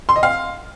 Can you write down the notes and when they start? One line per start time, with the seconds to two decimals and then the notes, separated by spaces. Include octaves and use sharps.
0.09 C6
0.16 D#5
0.23 F5